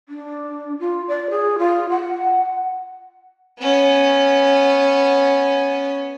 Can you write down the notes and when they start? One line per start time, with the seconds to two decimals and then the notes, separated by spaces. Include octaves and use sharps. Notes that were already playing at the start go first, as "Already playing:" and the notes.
0.09 D4
0.80 F4
1.08 D5
1.31 G#4
1.59 F4
1.90 F#5
3.58 B3 C#4